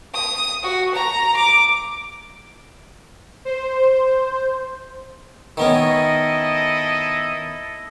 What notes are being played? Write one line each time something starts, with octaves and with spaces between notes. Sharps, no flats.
D#6
F#4
A#5
D6
C5
D#3 B3 C#4 E4 A4 D#5